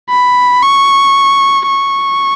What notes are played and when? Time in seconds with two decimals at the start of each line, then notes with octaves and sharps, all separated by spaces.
0.10 B5
0.62 C#6
1.67 C#6